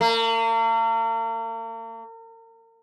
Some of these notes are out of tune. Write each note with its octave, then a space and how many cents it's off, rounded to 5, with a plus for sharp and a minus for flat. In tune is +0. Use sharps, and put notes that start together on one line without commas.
A#3 -40